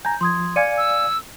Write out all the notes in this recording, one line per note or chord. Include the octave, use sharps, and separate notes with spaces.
G#5 A#5 G6
F3 C6 D#6 G#6
D5 F5 G#5 G#6 C#7 D#7
E6